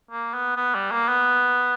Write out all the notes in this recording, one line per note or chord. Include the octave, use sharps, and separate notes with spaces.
A#3
B3
B3
G3
A#3
B3